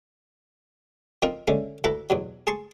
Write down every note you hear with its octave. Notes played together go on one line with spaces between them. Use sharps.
F3 C4 D#4 A#4
D3 G#3 A3 C#4
D2 E4 A4 B4 A#5
E2 B2 F#3
G#4 A5 C6 C#6